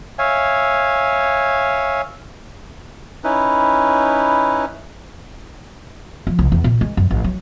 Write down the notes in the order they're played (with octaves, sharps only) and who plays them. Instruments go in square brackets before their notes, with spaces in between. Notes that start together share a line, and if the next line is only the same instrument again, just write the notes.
[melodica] C#5 E5 F5 G#5
C#4 D#4 E4 B4
[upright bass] F3
C2
E2
A#2
G#3
F#2
A1
F#3